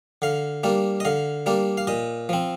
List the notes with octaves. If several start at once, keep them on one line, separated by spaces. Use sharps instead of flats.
D3 F5
G3 A#3 D4
D#5
D3 F5
G3 A#3 D4
F5
A#2 D#5
F3 C4